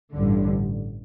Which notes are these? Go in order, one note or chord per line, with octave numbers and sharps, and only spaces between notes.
A1 G2 D3